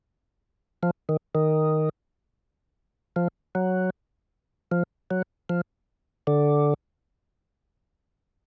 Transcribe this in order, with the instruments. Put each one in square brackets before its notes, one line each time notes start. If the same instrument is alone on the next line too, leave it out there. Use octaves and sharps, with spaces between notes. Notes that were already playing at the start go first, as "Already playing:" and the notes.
[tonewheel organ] F3
D#3
D#3
F3
F#3
F3
F#3
F3
D3